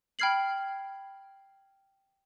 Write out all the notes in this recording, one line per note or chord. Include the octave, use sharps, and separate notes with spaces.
G5 B5 F6 G#6 C7 F#7